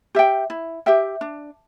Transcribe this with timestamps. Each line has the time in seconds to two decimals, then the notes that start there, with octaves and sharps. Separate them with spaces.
0.15 G4 E5 G5
0.50 E4
0.86 G4 E5 G5
1.21 D4